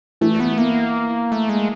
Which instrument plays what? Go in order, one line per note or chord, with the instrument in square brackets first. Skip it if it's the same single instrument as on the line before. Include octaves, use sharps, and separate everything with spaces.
[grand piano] E3 E4 [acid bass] A3
[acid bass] B3
A#3
A3
G#3